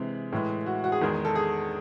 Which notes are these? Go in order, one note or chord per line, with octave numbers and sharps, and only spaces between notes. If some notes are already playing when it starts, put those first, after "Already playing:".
Already playing: C3 E3 G#3
A2 E3 G#3
F#4
F#4
G#4
E2 D#3 G#3
A4
G#4